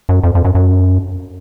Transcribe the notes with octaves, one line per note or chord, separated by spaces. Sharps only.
F#2
F2
F2
F#2
F#2